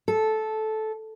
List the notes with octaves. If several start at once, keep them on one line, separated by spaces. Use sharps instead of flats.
A4